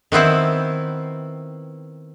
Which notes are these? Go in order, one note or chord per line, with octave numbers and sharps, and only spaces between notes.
D#3 B3 C4 E4